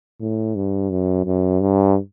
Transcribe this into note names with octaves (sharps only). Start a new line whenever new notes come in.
A2
G2
F#2
F#2
G2